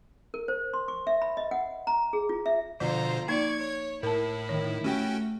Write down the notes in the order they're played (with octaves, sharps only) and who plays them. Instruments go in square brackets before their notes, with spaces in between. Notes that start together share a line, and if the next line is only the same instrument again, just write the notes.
[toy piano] A#4
C5
C6
C#6
E5
B5
D#5
F#5
A#5
G#4
F4
E5
[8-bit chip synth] B2 D3 C5 [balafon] F3 [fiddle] F4 A#5
[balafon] A#3 D#4 [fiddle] D5 C#6 [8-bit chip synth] G#6
[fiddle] C#5
[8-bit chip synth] A2 [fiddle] E4 [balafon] A#4 A5
[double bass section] D#3 [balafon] C#5
[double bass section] A3 [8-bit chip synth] C#4 F#4 G5 [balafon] G4